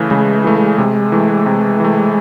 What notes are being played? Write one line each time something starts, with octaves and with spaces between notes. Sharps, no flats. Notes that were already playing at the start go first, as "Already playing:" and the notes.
Already playing: C#3 E3 A3
C#3 G#3
E3 A3
C3
E3 A3
C3
E3 A3